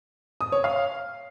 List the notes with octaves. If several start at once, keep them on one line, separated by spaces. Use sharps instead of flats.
D#6
C#5
F5